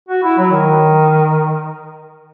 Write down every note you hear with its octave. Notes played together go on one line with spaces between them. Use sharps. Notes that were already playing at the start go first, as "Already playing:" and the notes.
F#4
E4
F#3
D#3